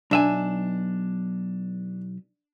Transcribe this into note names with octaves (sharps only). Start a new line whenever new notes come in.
B1 D4 E5 G#5